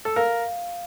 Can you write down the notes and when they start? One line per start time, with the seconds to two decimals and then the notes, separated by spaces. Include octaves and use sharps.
0.05 A4
0.16 A#4 F5